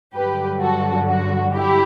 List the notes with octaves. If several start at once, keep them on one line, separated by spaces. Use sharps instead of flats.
G2 D3 F#3 G4 B4
F#4 A4
F#4
E4 G4